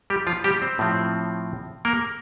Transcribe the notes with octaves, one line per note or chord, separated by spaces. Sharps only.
G3 G4
F3 F4
G3 G4
C4 C5
A2 F3 C4
A#3 A#4